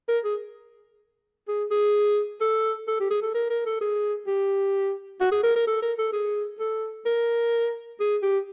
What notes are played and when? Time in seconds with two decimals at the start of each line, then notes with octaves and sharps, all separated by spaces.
0.08 A#4
0.24 G#4
1.48 G#4
1.71 G#4
2.41 A4
2.87 A4
3.00 G4
3.11 G#4
3.22 A4
3.34 A#4
3.50 A#4
3.65 A4
3.81 G#4
4.27 G4
5.21 F#4
5.32 G#4
5.43 A#4
5.56 A#4
5.67 A4
5.82 A#4
5.98 A4
6.13 G#4
6.59 A4
7.06 A#4
8.00 G#4
8.22 G4